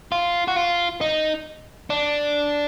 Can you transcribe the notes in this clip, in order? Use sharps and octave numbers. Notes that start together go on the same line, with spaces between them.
F4
F#4
F4
D#4
D4